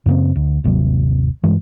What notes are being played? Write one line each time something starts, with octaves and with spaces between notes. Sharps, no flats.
F#2 C#3 A#3 C4
D2
G1 D#2 C3 F#3
G2 E3 G#3